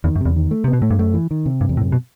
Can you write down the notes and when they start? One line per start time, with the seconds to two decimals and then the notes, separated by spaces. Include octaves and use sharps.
0.04 E2 D#3
0.16 F#2
0.21 E2 C3
0.36 D#3
0.51 A3
0.64 C3
0.68 B3
0.73 B2
0.82 A2 A3
0.91 G2
0.99 F#2 A3
1.14 E3
1.31 D#3
1.46 C3
1.61 G2
1.69 E2
1.77 A2
1.82 F#2
1.92 B2